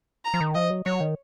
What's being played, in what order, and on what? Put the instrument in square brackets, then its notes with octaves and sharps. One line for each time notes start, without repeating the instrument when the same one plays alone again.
[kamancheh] A#5
[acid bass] F3
D#3
[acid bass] F3 [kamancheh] D#5
[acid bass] F#3
[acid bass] F#3 [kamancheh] C#5
[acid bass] D#3